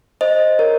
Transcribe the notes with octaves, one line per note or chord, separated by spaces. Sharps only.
C5 D#5
A#4 C#5